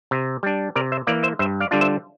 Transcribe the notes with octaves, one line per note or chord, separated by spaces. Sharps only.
C3
G3 D4
C3 A#4 D5
C5 E5
E3 A#3 D5 F5
C5 E5
G2 C5 E5
D5 F5
D3 G3 D4 F4
C5 E5